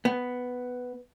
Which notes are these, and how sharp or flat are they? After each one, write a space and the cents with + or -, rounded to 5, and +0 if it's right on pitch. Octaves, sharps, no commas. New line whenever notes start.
B3 +5